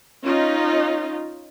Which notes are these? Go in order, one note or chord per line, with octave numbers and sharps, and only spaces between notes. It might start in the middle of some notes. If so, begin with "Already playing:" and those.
C#4 D#4 F4